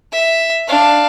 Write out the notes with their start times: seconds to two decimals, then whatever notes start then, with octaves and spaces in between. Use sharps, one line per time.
0.12 E5
0.67 D4 F5